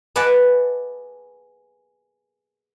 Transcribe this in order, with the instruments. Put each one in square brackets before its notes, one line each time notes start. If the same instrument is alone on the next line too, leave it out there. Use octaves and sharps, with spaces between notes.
[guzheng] G#4 B4 D5 D#5 F#5 A5